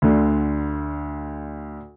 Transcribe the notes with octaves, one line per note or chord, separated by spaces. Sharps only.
D2 D3